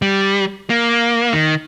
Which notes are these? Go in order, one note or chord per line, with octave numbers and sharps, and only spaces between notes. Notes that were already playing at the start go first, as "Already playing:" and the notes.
G3
A#3
D#3